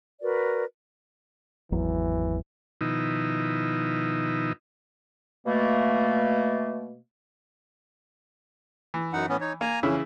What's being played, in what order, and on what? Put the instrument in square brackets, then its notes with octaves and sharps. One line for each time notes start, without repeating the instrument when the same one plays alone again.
[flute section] F#4 A#4 B4 D5
[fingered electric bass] G#1 E2 F#3 [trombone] E3
[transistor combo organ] B2 D#3 F3 D#4 E4
[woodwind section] B2 A3 A#3
[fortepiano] E3
[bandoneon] F#2 D#4 F#5
A2 B3 C#4
D#4 C#5
[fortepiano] A#3 [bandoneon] G#5 A#5
[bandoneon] F2 C#4 [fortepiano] C#3 E3 E4